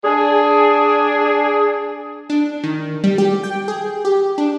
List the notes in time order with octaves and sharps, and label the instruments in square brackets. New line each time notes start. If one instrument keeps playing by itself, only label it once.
[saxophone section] D4 G#4
[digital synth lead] D4
D#3
G3
G4
G5
G#4
G4
D4